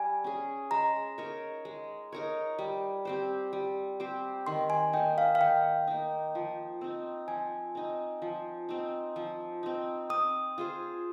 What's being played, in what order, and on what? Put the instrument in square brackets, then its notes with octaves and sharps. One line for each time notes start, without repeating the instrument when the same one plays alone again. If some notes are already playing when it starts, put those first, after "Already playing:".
Already playing: [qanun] G3 [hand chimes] G#5
[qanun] C#4 G#4
[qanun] G#3 [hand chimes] A#5
[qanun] D#4 A#4 C#5
G#3
D#4 A#4 C#5
G3
C4 G4 C5
G3
C4 G4 C5
[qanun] D#3 [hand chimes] C6
[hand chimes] G#5
[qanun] A#3 D#4 [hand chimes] G5
[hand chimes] F5
F5
[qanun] D#3 [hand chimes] G5
[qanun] A#3 D#4
F3
C4 D#4
[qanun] F3 [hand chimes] G#5
[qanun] C4 D#4
F3
C4 D#4
F3
C4 D#4
[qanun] C4 [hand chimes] D#6
[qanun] F4 G#4 C5